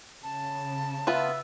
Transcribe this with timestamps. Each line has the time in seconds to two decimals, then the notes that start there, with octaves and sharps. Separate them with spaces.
0.23 C#3 A5
1.07 B3 F4 B4 E5